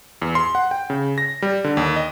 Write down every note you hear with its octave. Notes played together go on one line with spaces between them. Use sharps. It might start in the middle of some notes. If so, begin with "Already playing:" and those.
E2
C6
F#5
G5
C#3
A#6
G3
D3
D#2
D#5